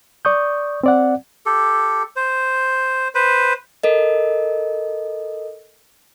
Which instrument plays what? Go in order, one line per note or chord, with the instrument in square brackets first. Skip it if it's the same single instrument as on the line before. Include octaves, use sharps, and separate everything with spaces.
[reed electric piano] D5 C#6 D#6 G6
C4 D5 F#5
[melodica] G4 A4
C5
B4 C5
[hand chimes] A4 A#4 D#5